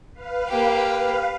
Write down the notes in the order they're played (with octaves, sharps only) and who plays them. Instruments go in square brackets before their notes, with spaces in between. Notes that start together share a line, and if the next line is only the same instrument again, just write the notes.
[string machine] B4 F5
[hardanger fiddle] A#3 G4